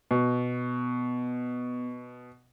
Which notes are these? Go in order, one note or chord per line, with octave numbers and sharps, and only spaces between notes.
B2 B3